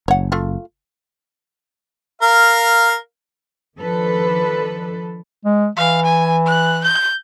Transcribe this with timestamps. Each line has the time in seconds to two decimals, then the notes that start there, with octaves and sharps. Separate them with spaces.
0.08 F#1 C#5 F#5
0.32 A3 F4 F5
2.22 A#4 F5
3.78 D#3 F3 D4 A4 B4
5.45 G#3
5.77 E3 F5
6.06 G#5
6.47 F#6
6.84 G6